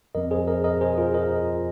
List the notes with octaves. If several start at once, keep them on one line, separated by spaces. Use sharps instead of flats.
F2 F3 C4 A#4 D#5
G#4 C5
A#4 D#5
A#4 D#5
G#4 C5
F4 A#4
A#4 D#5